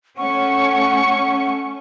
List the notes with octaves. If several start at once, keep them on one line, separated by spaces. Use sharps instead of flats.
A3 C#4 F#5 C#6